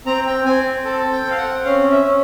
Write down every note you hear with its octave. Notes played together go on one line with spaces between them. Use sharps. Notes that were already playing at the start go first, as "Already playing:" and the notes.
C4 A#5
G5
C4 G#5
A4 A5
G5
C4
F5
F#5
C#4 F5
E5
C#4